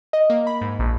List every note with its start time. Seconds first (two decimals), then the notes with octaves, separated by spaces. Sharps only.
0.13 D#5
0.30 A#3
0.47 B5
0.61 G#2
0.79 A#1